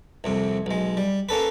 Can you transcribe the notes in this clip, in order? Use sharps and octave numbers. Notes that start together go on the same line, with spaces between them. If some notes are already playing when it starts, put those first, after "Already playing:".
C2 F2 C3
B1 G#3
G3
A#3 C#4 A4 B4